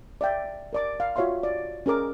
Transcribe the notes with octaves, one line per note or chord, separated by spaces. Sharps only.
D5 E5 G5
A#4 D5 D6
F5
F4 F#4 C#5 E5 F5 C6
D5
C#4 G#4 A#4 D6